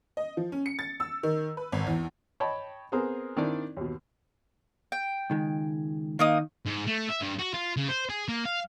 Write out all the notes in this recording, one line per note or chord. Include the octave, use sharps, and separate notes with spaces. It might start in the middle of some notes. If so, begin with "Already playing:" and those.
D#5
F3
C#4
C#7
A6
E6
D#3
B4
G#1
E2
C#5 D#5 G5 A5 B5
B3 C4 G#4 A#4 C5
D#3 C4 D4 E4 D5
D#2 B2
G5
C#2 D#3 G#3
D#3 A#3 D#4 D#6
G#2
A3
E5
G2
F#4
F4
C#3
C5
G#4
A#3
F5